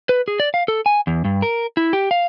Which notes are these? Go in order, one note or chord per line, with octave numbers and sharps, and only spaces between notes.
B4
G#4
D5
F5
A4
G#5
E2
G2
A#4
E4
G4
F5